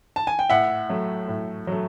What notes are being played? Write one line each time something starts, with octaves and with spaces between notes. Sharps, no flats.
A5
G#5
G5
A2 E5 F#5
F#3 A3
A2
F#3 A3